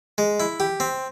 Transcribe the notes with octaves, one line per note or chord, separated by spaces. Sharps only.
G#3
E4
G4
C4